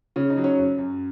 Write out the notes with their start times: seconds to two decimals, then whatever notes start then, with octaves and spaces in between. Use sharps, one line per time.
0.16 C#3 C#4
0.30 D#4
0.37 F#3
0.44 C#4
0.59 F#2
0.78 F#2